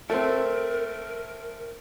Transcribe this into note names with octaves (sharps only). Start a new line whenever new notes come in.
A3 C4 A#4